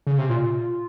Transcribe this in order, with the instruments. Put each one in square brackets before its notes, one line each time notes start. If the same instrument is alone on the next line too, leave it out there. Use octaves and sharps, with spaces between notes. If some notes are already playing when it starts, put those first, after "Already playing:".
[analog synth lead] C#3
C3
[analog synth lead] A#2 [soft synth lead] F4